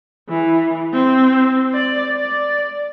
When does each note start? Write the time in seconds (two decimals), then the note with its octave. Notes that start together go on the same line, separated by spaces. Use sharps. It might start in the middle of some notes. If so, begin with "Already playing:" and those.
0.28 E3
0.94 C4
1.74 D5
2.15 D5